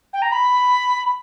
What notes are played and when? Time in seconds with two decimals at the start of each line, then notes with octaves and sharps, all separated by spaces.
0.13 G5
0.22 A#5
0.32 B5